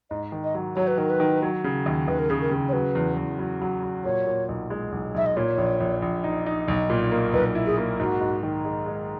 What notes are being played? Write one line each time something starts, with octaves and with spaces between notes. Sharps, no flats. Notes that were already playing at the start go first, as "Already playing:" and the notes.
G#2 D#5
D#3
D#5
F#3
F#3 C#5
B4
D#3 A#4
B4
D#3
F#3
C#3
D#2
D#2 B4
A#4
C#3 G#4
A#4
C#3
C#5
F#3 B4
E2
E2
F#3
F#3
F#3
A#2 C#5
A#2
B1
G#3
B1
B1 E5
D#5
A#2 C#5
A#1
A#1
A#1
D#4
D#4
B1
A#2
A#3
B1 B4
E4
G#4
A#3
G#2 F#4
G#2
D#3
G#3
G#3